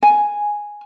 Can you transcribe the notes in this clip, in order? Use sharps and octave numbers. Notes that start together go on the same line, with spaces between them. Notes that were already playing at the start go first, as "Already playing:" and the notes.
G#5